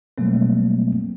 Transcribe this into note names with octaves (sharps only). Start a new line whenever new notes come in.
B2 F#3 G3 A3 A#3 C4